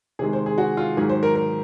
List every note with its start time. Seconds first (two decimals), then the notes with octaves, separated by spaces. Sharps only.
0.19 C3 D#3 G#3 G#4
0.33 C5
0.46 G#4
0.58 F#4
0.77 F4
0.97 G#2 D#3 F#3 G#4
1.09 C5
1.23 A#4
1.35 A#4